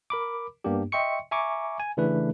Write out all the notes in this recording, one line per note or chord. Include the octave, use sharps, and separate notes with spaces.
A#4 B5 D6
G2 A#3 B3 D4 G4
D#5 E5 G5 C6 C#6 C#7
E5 G#5 A#5 C#6 D6
G#5
C#3 E3 A3 D4 A4 B4